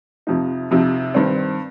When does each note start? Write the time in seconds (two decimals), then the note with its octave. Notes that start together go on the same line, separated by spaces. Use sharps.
0.27 F2 C3 F3 D#4
0.71 F2 C3 F3 D#4
1.14 G2 D#3 C4